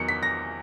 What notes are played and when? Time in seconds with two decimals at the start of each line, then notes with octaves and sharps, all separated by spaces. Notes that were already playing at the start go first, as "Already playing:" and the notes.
Already playing: E2 D#3 F#3 C#7
0.09 B6
0.23 A#6